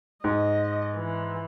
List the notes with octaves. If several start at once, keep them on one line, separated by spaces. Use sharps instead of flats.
G#2 D#5
E3